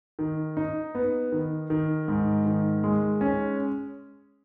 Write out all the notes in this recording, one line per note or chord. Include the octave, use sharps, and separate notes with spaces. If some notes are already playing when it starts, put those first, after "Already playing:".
D#3
D#4
B3
D#3
D#3
G#2
D#3
G#3
C#4